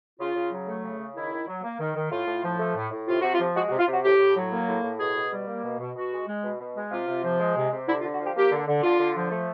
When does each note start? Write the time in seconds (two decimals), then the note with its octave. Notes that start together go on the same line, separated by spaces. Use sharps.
0.20 C#3 F4
0.36 C#3
0.51 F#3
0.67 A3
0.84 C#3
0.99 C#3
1.15 D#3 E4
1.32 D#3
1.47 F#3
1.63 A#3
1.80 D#3
1.95 D#3
2.11 A2 F4
2.27 A2
2.44 F3
2.59 A3
2.76 A2
2.91 A2
3.08 C3 F4
3.20 C3 F#4
3.33 F4
3.40 F3
3.55 G#3 F#4
3.67 F#4
3.71 C3
3.79 F4
3.88 C3 F#4
4.03 A2 G4
4.19 A2
4.36 F#3
4.51 A#3
4.68 A2
4.84 A2
4.99 B2 G#4
5.15 B2
5.32 G3
5.47 A#3
5.64 B2
5.80 B2
5.95 B2 F#4
6.12 G#3
6.27 G#3
6.44 B2
6.60 B2
6.75 G#3
6.91 C3 F4
7.08 C3
7.23 F3
7.39 G#3
7.56 C3
7.72 C3
7.87 D3 E4
8.00 F4
8.03 D3
8.12 F#4
8.20 F3 G4
8.36 A#3 G4
8.51 D3
8.67 D3
8.83 D3 F4
8.99 D3
9.16 F3
9.31 A3